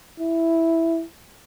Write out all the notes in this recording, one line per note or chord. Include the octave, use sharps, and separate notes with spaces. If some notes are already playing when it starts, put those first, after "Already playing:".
E4